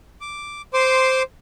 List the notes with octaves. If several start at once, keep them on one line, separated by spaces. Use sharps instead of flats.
D6
C5 C6 D6